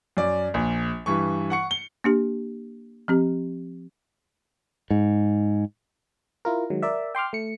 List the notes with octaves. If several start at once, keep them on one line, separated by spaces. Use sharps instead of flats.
F#2 D5
A#1
G2 E3 C#6
F#5 C#6 C#7
G7
A#3 D4 G4
F3 C4 G4
G#2
E4 F4 A#4
D#3 F#3 G#3
A#4 D5 E5
G5 C6 D6 F6
A3 C#7